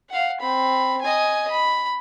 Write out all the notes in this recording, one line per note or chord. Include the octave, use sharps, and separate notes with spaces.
F5 F#5
C4 B5
D#5 G#5
B5